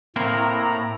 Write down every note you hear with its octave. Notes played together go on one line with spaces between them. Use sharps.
A2 A#3 C4 E4 A#5